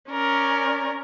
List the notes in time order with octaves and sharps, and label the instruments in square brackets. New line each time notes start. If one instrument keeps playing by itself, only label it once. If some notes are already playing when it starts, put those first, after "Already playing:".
[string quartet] C#4 A#4 D5